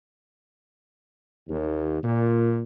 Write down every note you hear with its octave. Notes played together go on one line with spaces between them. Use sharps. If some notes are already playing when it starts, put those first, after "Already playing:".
D#2
A#2